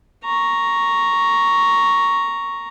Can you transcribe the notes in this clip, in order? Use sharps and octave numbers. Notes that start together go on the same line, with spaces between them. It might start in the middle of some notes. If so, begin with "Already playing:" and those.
A#5 C#6